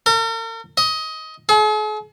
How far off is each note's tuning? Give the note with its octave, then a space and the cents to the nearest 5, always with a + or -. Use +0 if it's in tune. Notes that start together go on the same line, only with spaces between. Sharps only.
A#4 -45
D#5 +20
G#4 +45